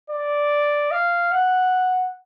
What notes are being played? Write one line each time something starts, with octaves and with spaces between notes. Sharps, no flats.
D5
F5
F#5